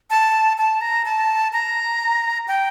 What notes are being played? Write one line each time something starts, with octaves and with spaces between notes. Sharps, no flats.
A5
A5
A#5
A5
A#5
G5